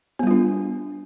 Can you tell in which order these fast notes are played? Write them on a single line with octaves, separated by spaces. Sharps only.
B3 G3 F4 D4